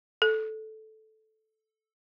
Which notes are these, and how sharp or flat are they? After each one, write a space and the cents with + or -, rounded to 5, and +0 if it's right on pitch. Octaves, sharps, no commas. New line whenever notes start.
A4 -10